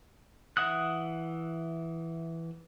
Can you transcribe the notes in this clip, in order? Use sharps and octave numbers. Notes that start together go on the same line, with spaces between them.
E3 E5 F#5 D#6 F#6